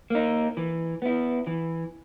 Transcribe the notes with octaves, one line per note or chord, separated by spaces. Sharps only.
A#3 D#4
E3
B3 E4
E3